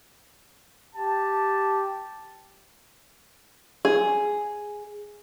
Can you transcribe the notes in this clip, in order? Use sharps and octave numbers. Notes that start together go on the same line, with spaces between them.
G4 A5
G#4